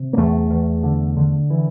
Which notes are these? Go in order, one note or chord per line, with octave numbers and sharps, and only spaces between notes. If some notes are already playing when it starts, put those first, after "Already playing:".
Already playing: C3
A#3
E2 A3
E2
D3
D3
E3